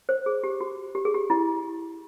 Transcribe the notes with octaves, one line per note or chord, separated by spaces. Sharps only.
C5
G#4
G4
F#4
G4
G#4
G4
E4